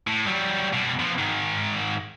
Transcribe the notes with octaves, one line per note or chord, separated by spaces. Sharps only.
A2
F#3 G3
B2 G3
B2 F3
G#2 D#3